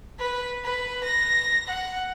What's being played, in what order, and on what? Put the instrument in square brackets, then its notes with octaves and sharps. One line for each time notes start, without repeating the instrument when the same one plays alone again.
[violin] B4
B4
A#6
F#5